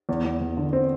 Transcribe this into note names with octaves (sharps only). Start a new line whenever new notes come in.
E2
E2
E2
D3
C4